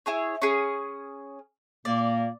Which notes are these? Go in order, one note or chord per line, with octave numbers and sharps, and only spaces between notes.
E4 G#4 C#5
C#4 G#4
A#2 A#3 D5